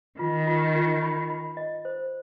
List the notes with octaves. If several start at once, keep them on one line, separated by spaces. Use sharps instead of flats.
D#3 F4
F4
F4
B5
B5
D#5
C5